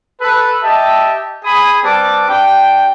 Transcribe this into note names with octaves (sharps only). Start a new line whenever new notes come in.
A4 B4
G4 D#5 E5 A5
G#4 G#5 B5 D#6
G3 C4 B4 A5 D6
D4 G4 G5